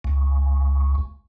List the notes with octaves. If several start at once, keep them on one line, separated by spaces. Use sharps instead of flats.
C#2